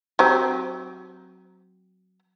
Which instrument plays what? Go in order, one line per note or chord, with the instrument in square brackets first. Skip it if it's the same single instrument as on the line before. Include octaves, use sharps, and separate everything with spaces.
[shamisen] F#3 C4 G4